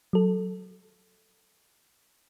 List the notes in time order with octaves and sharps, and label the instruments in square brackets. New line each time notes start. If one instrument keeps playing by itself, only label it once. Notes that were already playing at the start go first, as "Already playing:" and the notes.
[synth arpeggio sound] F#3 A4